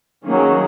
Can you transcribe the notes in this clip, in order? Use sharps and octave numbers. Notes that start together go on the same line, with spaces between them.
D#3 F#3 A#3 C#4 G#4